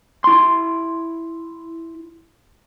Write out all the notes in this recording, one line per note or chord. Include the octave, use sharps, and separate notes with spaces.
E4 C6